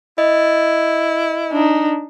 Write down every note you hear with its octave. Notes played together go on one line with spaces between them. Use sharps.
E4 D#5
D4 D#4